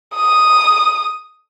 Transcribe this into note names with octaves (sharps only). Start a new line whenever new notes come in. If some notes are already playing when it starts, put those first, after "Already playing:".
D#6